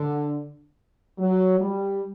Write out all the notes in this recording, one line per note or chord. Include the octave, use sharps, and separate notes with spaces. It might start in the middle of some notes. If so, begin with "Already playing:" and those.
Already playing: D3
F#3
G3